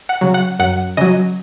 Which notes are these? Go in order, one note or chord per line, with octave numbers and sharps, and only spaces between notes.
F#5
C#3 F#3
F#5
F#2 F#5
C#3 F#3 D#5